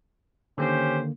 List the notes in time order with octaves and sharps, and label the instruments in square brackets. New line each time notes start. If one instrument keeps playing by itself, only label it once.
[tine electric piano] D3 D#3 A#3 [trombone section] C#4 G4 C5